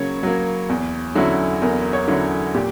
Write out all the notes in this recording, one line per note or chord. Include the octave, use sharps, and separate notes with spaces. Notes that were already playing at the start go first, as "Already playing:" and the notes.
Already playing: C#3 F#3 A#3 C#5
F#3 A#3
E2
D3 F#3 C#4 E4
E2 A#4
C#5
D3 F#3 C#4 E4
A#2 G4